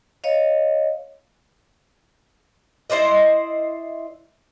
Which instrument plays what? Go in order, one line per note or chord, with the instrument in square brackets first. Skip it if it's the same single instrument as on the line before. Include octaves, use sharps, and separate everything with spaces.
[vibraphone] C#5 D#5 F5
[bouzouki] E4 C5 D5 D#5